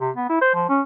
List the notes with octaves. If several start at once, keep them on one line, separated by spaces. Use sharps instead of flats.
C3
B3
E4
C5
F3
C#4